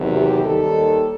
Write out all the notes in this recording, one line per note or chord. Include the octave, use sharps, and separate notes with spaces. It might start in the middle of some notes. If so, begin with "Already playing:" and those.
Already playing: E2 C3 D#3 F#3
G4
D#2 D#3 G3 A4